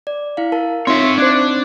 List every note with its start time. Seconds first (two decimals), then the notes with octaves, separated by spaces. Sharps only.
0.07 D5
0.37 E4 F5
0.52 A#4 A5
0.87 C4 D#4 F4 C#5 E5 C6
1.18 D4 C5 F#6 G#6